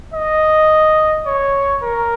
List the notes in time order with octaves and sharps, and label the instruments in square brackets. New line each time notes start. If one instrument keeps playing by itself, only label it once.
[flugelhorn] D#5
C#5
A#4